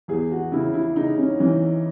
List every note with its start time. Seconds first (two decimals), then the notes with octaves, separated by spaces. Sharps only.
0.08 E2 G#4
0.31 F#4
0.52 C#3 E4
0.74 E4
0.96 C#3 D#4
1.18 C#4
1.39 E3 C#4